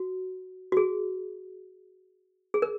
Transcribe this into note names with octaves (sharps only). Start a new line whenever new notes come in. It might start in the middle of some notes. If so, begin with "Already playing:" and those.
Already playing: F#4
F#4
G#4
G#4
A#4